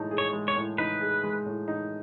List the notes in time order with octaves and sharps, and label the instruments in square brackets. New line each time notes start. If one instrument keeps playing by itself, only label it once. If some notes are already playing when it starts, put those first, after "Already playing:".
Already playing: [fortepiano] A2 G#3 D#4
G#4
[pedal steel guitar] C#5
[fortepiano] G#3
[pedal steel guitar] C#5
[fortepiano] A2
[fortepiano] D#4 [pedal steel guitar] B4
[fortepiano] G#4
G#3
A2
D#4